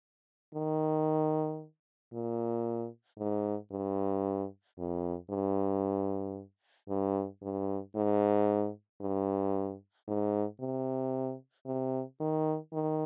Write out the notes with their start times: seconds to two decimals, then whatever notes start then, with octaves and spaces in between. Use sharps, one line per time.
0.54 D#3
2.13 A#2
3.19 G#2
3.72 G2
4.78 F2
5.30 G2
6.89 G2
7.42 G2
7.95 G#2
9.01 G2
10.08 G#2
10.60 C3
11.66 C3
12.20 D#3
12.73 D#3